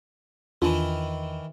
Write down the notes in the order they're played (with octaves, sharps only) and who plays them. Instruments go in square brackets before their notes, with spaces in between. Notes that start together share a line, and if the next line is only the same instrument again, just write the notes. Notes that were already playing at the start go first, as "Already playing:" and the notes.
[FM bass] E2 [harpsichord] D#3 E3 [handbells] D4 F4